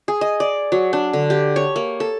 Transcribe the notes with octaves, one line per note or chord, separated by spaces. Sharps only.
G#4
D#5
D5
F#3
D4
D3
G4
C#5
A#3
A4